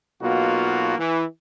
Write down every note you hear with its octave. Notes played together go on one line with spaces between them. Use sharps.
B1 B2 A#3 F4 F#4
E3